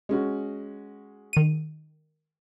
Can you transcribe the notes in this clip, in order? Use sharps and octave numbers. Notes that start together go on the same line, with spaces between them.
G#3 C#4 F#4
D#3 D#7